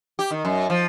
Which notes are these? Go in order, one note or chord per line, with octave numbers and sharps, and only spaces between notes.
G4
D#3
F#2
F3